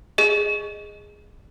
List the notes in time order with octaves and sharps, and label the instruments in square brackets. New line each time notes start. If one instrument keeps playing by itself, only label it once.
[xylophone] G#4 D#5